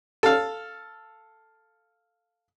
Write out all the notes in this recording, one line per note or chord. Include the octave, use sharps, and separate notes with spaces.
A4 F5